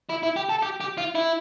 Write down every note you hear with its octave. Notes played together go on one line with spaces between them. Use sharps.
E4
E4
G4
A4
G4
G4
F4
E4